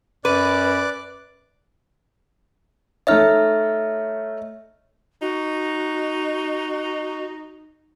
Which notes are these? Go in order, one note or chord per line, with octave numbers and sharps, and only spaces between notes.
F#2 B4 D5 D6 F#6
A3 D#4 C#5 D#5 E5 F6
D#4 F#4